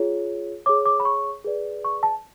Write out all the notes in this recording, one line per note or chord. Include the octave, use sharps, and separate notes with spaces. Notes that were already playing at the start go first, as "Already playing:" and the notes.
Already playing: F4 G#4 C#5
G#4 C#5 D6
D6
B5
C#6
G#4 B4 D5
C#6
A5